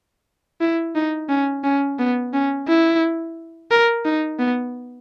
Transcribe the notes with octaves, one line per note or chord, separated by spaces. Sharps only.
E4
D#4
C#4
C#4
B3
C#4
E4
A#4
D#4
B3